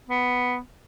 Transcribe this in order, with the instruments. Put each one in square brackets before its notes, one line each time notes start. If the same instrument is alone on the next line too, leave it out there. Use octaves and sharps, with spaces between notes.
[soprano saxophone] B3